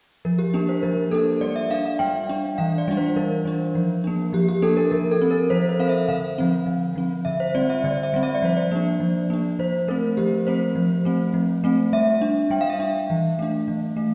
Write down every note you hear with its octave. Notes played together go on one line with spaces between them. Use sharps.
F3 A#4
G4
A#3 D4
C5
F3 A#4
A#3 D4 A4
G3 D5
E5
D4 F5
F5
G3 G5
D4
E3 F5
D5
G3 D4
C5
E3 A#4
G3 D4
F3
A#3 D4
F3 G4
G4
A#3 D4 A4
A#4
F3 A#4
A4
C4
A#4
F3 C5
C5
C4 F5
E5
D3 F5
F3 C4
D3
F3 C4
D3 E5
C5
G3 C4 D5
E5
D3 D5
E5
G3 C4
E5
D5
F3 C5
D5
A#3 D4
F3
A#3 D4
F3 C5
A3 C4 A#4
F3 G4
A3 C4 C5
F3
A3 C4
F3
A3 C4
G3 E5
D4
G3 G5
F5
E5
D4 F5
E3
A3 D4
E3
A3